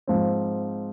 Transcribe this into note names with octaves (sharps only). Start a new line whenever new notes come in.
G#2 F3 C4